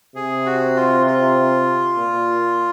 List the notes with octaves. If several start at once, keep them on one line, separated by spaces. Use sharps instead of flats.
C3 G#4
F#4
F4
F4
A#2